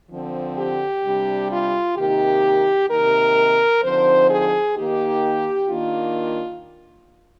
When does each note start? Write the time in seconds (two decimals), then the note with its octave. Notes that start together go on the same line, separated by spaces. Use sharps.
0.11 D3 F3 C4
0.57 G4
1.04 C3 G3 D4
1.50 F4
1.96 C3 D#3 A#3 D#4 G4
2.89 C3 D#3 A#3 D#4 A#4
3.82 D3 F3 C4 D#4 C5
4.29 G#4
4.76 D#3 A#3 D#4 G4
5.68 D#3 A#3 D4 F4